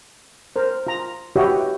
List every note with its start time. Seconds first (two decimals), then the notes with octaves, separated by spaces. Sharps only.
0.56 A#4 C5
0.87 F4 A#5
1.36 E4 F#4 G4 B4 C#5 D#5